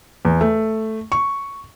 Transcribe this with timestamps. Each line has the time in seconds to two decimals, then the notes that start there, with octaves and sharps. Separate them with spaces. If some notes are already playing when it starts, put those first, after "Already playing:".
0.25 E2
0.41 A3
1.12 C#6